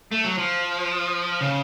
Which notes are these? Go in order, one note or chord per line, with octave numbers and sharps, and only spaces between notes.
A3
F#3
F3
C#3